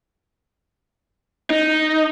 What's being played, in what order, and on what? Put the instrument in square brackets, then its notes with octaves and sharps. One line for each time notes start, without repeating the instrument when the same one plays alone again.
[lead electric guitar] D#4